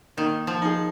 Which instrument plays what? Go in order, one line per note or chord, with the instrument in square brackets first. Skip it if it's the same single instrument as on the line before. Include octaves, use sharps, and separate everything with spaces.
[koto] D#3 [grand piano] A#3
[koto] F3
[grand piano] D#4 G#4